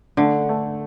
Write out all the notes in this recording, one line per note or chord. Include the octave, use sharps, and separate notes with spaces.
D3 A3
A3